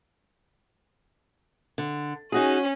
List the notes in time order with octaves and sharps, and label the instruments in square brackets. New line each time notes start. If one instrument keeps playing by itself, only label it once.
[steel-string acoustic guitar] D3
[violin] C#4 [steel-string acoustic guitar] D#4 F#4 G#4